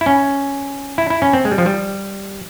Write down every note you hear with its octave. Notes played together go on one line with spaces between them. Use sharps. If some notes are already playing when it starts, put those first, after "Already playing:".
E4
C#4
E4
E4
C#4
C4
G#3
G3
F3
G3